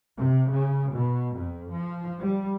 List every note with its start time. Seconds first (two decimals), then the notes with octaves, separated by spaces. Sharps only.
0.16 C3
0.49 C#3
0.93 B2
1.35 F2
1.72 F3
2.19 G3